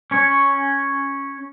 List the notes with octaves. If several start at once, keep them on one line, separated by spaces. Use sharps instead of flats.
C#4 C#5